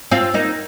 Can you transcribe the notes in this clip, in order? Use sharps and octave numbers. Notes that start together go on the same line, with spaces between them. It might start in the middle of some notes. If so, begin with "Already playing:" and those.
C4 F4
A#3 D#4